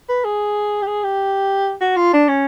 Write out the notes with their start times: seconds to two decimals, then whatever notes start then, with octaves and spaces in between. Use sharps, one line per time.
0.09 B4
0.25 G#4
0.82 G4
0.87 G#4
1.04 G4
1.81 F#4
1.97 F4
2.13 D4
2.28 C#4